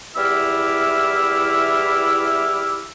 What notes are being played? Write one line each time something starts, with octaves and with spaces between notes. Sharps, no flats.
E2 G3 E4 E5 D6 F6